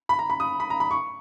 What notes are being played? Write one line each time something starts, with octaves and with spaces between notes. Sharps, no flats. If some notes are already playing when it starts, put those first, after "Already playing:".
B5
A#5
B5
D#6
B5
A#5
B5
C#6